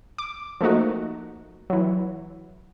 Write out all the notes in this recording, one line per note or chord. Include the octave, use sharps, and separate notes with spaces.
D6
F3 A3 A#3 D#4 F#4
E3 F#3